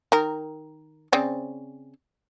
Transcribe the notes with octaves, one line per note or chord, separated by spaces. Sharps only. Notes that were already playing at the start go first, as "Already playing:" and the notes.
D#3 A#4
C#3 C4 D5